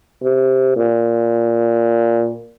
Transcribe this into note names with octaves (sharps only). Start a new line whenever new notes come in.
C3
A#2